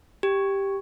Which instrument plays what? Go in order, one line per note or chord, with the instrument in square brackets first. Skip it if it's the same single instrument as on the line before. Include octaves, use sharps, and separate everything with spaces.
[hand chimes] G4